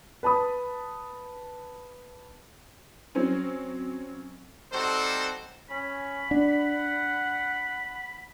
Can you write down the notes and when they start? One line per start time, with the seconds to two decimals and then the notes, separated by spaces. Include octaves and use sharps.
0.23 B4 A5 B5 D#6
3.15 F#3 C4 C#4
4.72 G3 C4 D#4 F#4 A4 C5
5.70 C#4 B5
6.31 D4 F#5